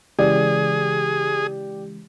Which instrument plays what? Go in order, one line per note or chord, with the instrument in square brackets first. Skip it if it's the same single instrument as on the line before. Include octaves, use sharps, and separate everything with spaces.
[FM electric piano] C#3 E3 G#3 [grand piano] G4 D5 [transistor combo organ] G#4